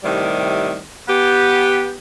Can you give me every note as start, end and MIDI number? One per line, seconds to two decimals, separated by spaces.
0.03 0.79 45
0.03 0.79 48
0.03 0.79 51
0.03 0.79 55
1.08 1.96 59
1.08 1.96 67